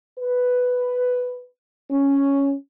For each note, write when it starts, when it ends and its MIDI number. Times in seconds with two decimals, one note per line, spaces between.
0.19 1.46 71
1.91 2.53 61